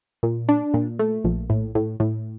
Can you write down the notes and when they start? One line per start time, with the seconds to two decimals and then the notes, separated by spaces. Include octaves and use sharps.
0.23 A#2
0.49 D4
0.74 A#2
0.99 A3
1.24 A#1
1.50 A2
1.75 A2
2.00 A2